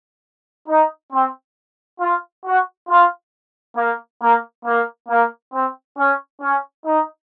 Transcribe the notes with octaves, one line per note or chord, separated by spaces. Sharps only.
D#4
C4
F4
F#4
F4
A#3
A#3
A#3
A#3
C4
C#4
C#4
D#4